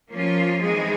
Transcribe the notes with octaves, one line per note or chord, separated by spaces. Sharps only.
F3 A#3 C#4 F4
E3 G#3 C4 D#4 G#4